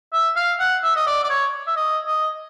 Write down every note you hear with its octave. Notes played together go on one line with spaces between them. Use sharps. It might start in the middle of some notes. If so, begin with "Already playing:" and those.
E5
F5
F#5
E5
D#5
D5
D5
C#5
E5
D#5
D#5